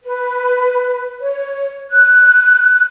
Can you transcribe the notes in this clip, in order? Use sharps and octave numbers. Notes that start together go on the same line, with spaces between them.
B4
C#5
F#6